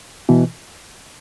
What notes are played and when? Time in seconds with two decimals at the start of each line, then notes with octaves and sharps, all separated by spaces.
0.29 B2 E3